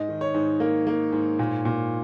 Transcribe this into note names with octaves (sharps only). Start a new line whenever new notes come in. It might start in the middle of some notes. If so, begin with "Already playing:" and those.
Already playing: G#2 D#5
D#3
C#5
G#2
A#3
A#3
G#2
A#2
A#2